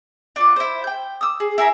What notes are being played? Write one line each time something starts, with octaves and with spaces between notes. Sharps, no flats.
D4 F4 F#5
E4 C5
G5 G6
D#6 E6
G#4
E4 G#4 A#4 E5